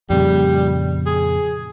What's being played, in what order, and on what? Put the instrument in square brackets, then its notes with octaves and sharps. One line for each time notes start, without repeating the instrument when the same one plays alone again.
[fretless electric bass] F2 A#2 C#3 [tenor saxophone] G3
[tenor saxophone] G#4